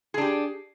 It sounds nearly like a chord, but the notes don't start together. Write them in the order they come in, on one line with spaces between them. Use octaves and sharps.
G#4 D4 G4